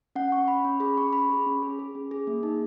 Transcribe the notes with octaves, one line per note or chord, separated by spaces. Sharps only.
C#4 F#5
C#4 C#6
C#4 B5
C#4
G#4 B5
C#4 C#6
G#4 B5
G#4
C#4
G#4
G#4
C#4
G#4
A#3
D#4